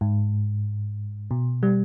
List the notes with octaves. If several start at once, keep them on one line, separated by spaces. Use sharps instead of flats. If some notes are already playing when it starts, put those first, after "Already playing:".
G#2
B2
G3